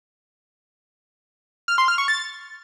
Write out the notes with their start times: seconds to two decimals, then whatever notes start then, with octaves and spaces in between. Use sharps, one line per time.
1.68 F6
1.78 C6
1.88 F6
1.98 C#6
2.08 A6